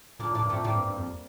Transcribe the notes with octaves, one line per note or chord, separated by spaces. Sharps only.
A#2 A#3 D4
A2 A#3 D4
G2
A#2 A3 C4
A2 G3 A#3
G2
G2
F2